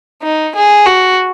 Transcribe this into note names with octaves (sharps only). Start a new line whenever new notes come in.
D#4
G#4
F#4